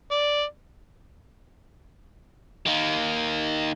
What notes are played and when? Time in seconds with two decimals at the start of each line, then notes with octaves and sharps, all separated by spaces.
0.11 D5
2.66 D#3 A#3